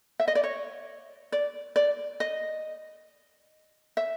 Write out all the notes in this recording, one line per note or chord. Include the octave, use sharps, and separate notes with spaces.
E5
D#5
D5
C#5
D5
D5
D#5
E5